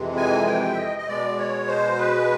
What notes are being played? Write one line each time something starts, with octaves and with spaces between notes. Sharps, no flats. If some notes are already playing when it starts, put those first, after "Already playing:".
Already playing: F2 C3 E3 G#3
G#5
G5
E5
D#5
D#5
B2 G#3 D5
C#5
C5
B4